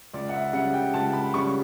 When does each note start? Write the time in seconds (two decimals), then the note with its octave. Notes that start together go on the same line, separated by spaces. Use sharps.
0.13 C#2 D5
0.29 F#5
0.34 E5
0.53 C#3 G3 F#5
0.73 G5
0.94 C#2 A5
1.13 B5
1.34 C#3 G3 C#6